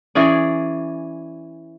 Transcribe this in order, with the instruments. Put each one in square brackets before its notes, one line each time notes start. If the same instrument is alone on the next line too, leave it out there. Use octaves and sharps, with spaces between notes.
[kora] E3 C#4 G#4 D5